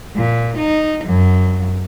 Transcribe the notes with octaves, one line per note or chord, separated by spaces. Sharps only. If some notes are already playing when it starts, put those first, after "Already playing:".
A#2
D#4
F#2